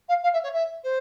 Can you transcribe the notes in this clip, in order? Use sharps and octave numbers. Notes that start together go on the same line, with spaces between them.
F5
F5
E5
C#5
E5
C5